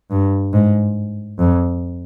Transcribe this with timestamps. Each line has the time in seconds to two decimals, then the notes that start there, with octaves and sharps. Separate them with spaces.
0.11 G2
0.53 G#2
1.39 F2